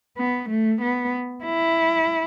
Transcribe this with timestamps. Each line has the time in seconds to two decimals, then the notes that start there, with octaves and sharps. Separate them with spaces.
0.17 B3
0.49 A3
0.81 B3
1.44 E4